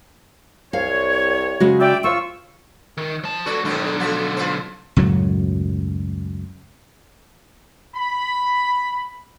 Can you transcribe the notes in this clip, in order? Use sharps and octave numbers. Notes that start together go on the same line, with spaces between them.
C2 C#5 F5
C#3 G#3 F#4
D5 E5 G5
F4 C#5 C#6 E6
D#3
F3 A5
F3 F#4 A4 B4 D5
B1 G#2 D3 D#3 D4
F3 A3 F#4
F4 B4 C5
C#2 F#2 A2 F#3
B5